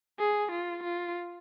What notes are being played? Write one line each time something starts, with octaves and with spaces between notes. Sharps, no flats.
G#4
F4
F4